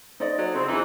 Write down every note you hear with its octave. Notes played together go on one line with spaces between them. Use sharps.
D#4 C5 D5 D#5
F#3 A4
C#3 C4 F4
E2 E3 D#4